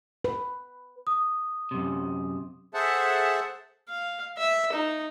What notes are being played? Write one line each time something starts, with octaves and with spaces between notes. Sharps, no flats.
B4
D#6
F#2 C3
G#4 A4 C5 E5 F#5 A5
F5
E5
D#4